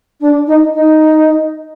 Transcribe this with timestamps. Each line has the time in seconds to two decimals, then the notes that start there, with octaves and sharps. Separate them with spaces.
0.20 D4
0.46 D#4
0.73 D#4